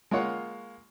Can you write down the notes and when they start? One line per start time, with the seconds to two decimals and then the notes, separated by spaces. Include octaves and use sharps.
0.11 G#3 A#3 F4 C#5 F#5